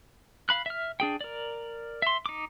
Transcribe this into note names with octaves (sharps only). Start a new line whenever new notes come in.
F5 B5 F#6
E5 F6
D4 G#4 G5
A#4 D5
E5 C6
D#4 D6